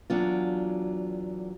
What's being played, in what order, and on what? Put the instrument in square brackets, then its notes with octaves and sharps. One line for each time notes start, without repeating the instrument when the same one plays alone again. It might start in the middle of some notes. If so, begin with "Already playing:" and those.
[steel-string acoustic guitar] E2 F#3 D4 F4